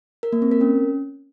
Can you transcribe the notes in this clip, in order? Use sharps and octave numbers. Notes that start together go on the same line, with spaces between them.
A#4
A#3
C4
A#4
C#4